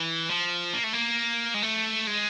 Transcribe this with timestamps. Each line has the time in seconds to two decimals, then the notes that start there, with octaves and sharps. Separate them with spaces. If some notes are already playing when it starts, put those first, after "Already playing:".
Already playing: E3
0.30 F3
0.74 A#3
0.84 A3
0.93 A#3
1.54 G#3
1.62 A3
2.07 G#3